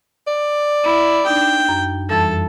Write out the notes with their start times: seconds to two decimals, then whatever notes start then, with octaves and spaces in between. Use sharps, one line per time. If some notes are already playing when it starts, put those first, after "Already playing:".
0.27 D5
0.84 E4
1.26 D4 D#4 G5
1.69 F#2
2.09 F2 E3 G3 A4